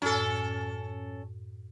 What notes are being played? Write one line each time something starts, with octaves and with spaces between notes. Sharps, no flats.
F#2 A2 C#4 A4